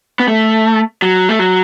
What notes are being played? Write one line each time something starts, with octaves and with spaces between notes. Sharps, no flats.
B3
A3
F#3
A3
F#3